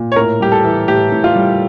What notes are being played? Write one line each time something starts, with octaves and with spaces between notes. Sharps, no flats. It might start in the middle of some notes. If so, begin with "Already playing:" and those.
Already playing: A#2
C#5
A2 A#4
G3 G4
A4
E3
A2 G4
A2
F4
G3